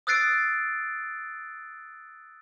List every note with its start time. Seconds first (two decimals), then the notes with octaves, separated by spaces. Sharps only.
0.07 D#6 E6 F#6 A6 C7 D7